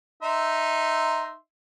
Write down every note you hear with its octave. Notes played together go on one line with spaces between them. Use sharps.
D#4 E5 C6